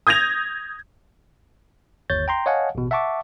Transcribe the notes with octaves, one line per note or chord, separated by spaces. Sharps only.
D#6 G6 G#6 A#6 F7
G1 D#2 C#5 G6 A6
G5 A#5 C6
C#5 D#5 F5 F#5 G#5 A5
A1 B2
E5 F#5 A5 C#6 D6